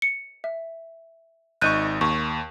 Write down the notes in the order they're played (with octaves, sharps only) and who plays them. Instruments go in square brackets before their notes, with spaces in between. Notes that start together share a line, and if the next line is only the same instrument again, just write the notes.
[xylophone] C#7
E5
[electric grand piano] G#1 D#4 C#6 [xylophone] F#6 G6 D#7
[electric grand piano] D#2 [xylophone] C#6